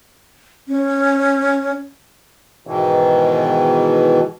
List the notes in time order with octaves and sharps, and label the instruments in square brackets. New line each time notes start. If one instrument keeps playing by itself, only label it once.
[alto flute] C#4
[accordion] G#2 B2 D#3 E3